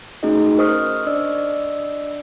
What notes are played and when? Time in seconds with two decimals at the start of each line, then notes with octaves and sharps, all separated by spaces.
0.23 A3 C#4 D#4 F#4 G#4 D#5
0.58 A#4 C5 D#5 C#6 D#6 F6
1.07 D4 D5 D#5 E6